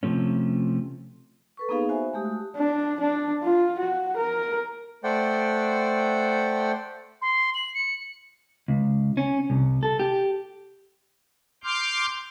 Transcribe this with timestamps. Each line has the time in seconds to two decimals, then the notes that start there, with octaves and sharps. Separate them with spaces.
0.03 C3 F3 A3 C#4
1.57 A4 B4 C#6
1.69 A#3 B3 D#4 G#4 F5 B5
1.89 F#4 C5 E5 G#5
2.13 G#3 A3 G4 D#6
2.25 F#4
2.57 D4
3.00 D4
3.43 F4
3.79 F#4
4.17 A#4
5.04 A3 C5 D5 F#5 G5
7.22 C6
7.55 F#7
7.75 C#7
8.68 C#2
9.17 C#4
9.50 C2
9.83 A4
10.00 G4
11.64 C6 D6 F6 G6